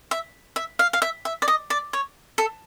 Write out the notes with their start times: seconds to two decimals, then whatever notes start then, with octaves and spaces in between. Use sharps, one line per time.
0.11 E5
0.56 E5
0.79 F5
0.93 F5
1.02 E5
1.25 E5
1.42 D5
1.48 D#5
1.70 D5
1.93 C#5
2.38 A4